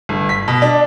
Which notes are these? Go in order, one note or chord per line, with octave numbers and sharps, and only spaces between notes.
G1
B6
B2
D4